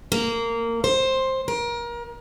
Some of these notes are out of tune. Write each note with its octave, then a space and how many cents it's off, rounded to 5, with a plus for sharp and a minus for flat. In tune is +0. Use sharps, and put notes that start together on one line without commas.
A#3 -15
C5 +10
A#4 +30